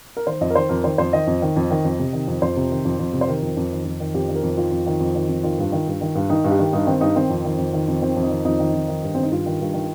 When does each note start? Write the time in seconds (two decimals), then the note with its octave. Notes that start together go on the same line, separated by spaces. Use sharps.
0.17 A#4
0.26 D#3 C5
0.41 F2 D#5
0.50 A#4
0.55 D#3 C5
0.69 F2 A#4
0.84 D#3 C5
0.98 F2 C5
1.12 D#3 D#5
1.27 F2
1.42 D#3
1.56 F2
1.70 D#3
1.85 F2
1.99 C3
2.13 D#3
2.28 F2
2.42 F2 C5
2.56 C3
2.71 D#3
2.85 F2
2.99 F2
3.13 C3
3.21 C5
3.28 D#3 A#4
3.42 F2
3.57 F2
3.72 D#3
3.85 F2
4.00 D#3
4.14 F2 G4
4.29 D#3
4.35 A#4
4.43 F2
4.57 D#3 F4
4.72 F2
4.87 D#3
5.00 F2
5.15 D#3
5.29 F2
5.43 D#3 F4
5.58 G2
5.72 D#3
5.87 G2
6.01 D#3
6.15 G2
6.30 D#3 D#4
6.44 G2
6.51 G4
6.59 D#3
6.73 G2 D#4
6.87 D#3 C4
7.01 G2 D#4
7.16 D#3 C4
7.30 F2
7.44 D#3
7.58 F2
7.73 D#3
7.88 F2
8.02 D#3 C4
8.16 F2
8.23 D#4
8.31 D#3
8.45 F2 D#4
8.59 D#3
8.73 F2
8.88 D#3
9.02 G2
9.15 D#3 C4
9.23 D#4
9.31 G2 F4
9.46 D#3
9.60 G2
9.74 D#3